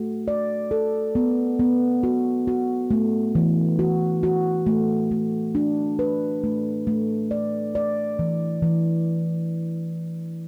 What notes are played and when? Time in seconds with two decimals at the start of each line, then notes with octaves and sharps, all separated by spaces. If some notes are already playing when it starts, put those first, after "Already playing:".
Already playing: A3 F#4
0.28 D5
0.71 A4
1.15 B3
1.59 B3
2.03 F#4
2.48 F#4
2.91 A3
3.35 E3
3.79 F#4
4.23 F#4
4.67 A3
5.11 A3
5.55 D4
5.99 B4
6.44 A3
6.87 A3
7.31 D5
7.75 D5
8.19 E3
8.62 E3